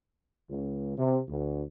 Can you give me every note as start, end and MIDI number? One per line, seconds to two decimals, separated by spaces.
0.49 0.95 37
0.98 1.19 48
1.28 1.62 38